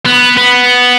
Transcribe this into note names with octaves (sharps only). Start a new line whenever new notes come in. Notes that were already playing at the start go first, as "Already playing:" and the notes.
B3
B3